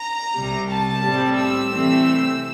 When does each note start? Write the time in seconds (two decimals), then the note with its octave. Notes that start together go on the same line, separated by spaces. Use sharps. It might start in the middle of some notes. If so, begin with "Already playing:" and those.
Already playing: A#5
0.35 C2 C3 G3
0.69 A5
1.02 A2 G3 C4
1.36 E6
1.69 C3 E3 A3 C4